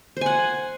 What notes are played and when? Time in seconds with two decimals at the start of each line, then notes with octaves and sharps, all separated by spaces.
0.17 C5
0.21 G#5
0.26 F#5